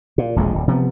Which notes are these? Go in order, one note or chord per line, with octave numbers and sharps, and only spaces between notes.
A#2
E1 A#1 F2 G#3
D1
C3 F3 B3